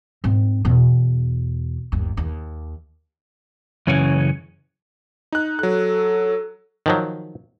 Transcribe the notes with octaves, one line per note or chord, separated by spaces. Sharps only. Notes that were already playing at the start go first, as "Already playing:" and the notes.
G#2 C4
E2 B2
G1 D#2
D#2
F#2 C#3 E3 C#4
D#4 F#6
F#3 A4 F#6
D#3 F3 F#3